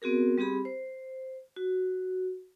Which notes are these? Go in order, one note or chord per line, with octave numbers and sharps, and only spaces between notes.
B3 C4 F#4 G#4 A#4
G3 C4 G4 G#4 B5
C5
F#4